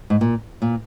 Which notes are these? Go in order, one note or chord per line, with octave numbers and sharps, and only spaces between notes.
G#2
A#2
A#2